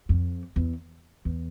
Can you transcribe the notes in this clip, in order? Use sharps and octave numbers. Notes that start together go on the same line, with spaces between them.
F2
E2
E2